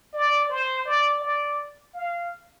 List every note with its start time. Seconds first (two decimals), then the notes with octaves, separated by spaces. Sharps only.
0.13 D5
0.49 C5
0.85 D5
1.22 D5
1.94 F5